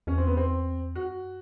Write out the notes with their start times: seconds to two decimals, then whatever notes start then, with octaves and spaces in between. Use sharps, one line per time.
0.07 E2 C#4
0.18 C4
0.27 B3
0.37 C4
0.95 F#2 F#4